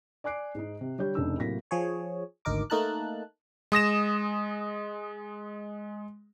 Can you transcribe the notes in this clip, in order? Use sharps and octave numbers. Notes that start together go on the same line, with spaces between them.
D5 G#5 D6 F#6 C7 D7
G#2 D#4
C3
D3 G3 C#5 G6
F1 C#3 D4 D#4 E6
A2 C3 F#3 A#3 A#6 B6
F3 G#4 C#5
G#1 D2 D#4 A#4 D6
A3 A#3 D#4 A#4 A5 F#6
G#3 D#6 A#6 E7